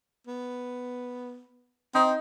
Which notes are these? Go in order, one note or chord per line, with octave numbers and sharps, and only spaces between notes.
B3
C4 D#4